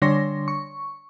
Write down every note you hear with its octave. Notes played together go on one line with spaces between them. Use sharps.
D3 G3 D4 C#5 C6 A#6
C#6